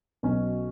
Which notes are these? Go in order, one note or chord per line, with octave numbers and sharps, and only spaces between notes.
B1 B2 F#3 C#4